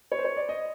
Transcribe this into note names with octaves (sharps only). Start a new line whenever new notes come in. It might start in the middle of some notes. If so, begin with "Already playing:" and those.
C#5
C5
C#5
D5
D#5